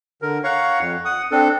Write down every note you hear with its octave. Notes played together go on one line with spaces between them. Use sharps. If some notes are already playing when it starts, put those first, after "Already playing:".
D3 A#4
C#5 F5 F#5 A#5 C#6
F2
F#5 D#6
C4 D4 A4